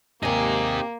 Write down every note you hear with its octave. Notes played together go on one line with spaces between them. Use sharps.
D#2 C3 A#3 C4 D#4 G4 G#5